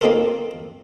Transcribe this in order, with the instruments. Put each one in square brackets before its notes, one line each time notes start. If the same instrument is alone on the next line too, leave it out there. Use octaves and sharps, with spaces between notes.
[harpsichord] A#3 C4 D#4 F4 A4 A#4